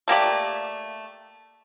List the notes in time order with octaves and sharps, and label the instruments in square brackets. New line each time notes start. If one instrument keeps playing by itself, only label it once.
[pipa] A3 A#3 G4 D5